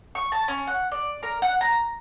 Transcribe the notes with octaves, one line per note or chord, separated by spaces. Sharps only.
C#6
A5
C#4
F#5
D5
A#4
F#5
A#5